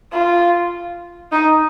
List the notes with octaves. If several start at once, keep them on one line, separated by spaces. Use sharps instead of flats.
F4
D#4